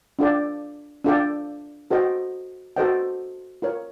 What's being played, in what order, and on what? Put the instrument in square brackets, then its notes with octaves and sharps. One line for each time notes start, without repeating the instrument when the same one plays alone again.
[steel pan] D4 F4 A4 D5 G5
D4 F4 A4 D5 G5
F#4 A4 C5 D#5 G5
F#4 A4 C5 D#5 G5
F4 A#4 C#5